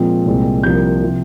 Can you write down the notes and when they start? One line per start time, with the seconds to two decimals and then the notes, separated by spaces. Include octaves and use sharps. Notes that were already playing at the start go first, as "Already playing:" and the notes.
Already playing: A#2 F3 G#3 C4
0.26 C2 A#2 G#3 C4
0.63 C2 C3 F3 A#3 G6
1.03 C3 F3